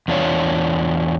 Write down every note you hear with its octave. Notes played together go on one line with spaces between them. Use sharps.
E2 D4 F4 C#5